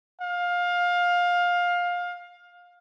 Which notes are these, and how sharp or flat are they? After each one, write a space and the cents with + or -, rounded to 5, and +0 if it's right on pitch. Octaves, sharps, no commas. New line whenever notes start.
F5 +20